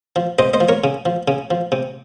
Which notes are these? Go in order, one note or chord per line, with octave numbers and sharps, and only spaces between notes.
F3
C3 C5 D#5
C5 D#5
F3
A#4 C#5
C#3
F3
C#3
F3
C3